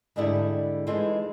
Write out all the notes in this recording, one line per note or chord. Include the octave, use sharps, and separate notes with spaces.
G#2 D3 G3 D4 E4 G#4
E3 G#3 D#4 F4 A4